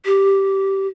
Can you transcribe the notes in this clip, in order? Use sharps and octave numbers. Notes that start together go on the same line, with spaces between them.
G4